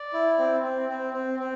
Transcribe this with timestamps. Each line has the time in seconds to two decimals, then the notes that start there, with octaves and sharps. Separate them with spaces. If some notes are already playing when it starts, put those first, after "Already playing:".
Already playing: D5
0.13 E4
0.39 C4
0.63 C4
0.89 C4
1.13 C4
1.40 C4